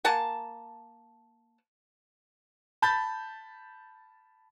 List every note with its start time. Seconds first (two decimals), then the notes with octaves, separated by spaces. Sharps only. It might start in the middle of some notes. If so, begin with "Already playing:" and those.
0.05 A#3 F#5 G#5 A5
2.82 A5 B5 G6 A6